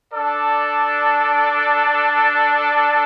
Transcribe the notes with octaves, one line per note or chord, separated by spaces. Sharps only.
D4 A4 D5